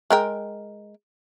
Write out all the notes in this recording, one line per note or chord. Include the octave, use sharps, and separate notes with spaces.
G#3 A#4 G5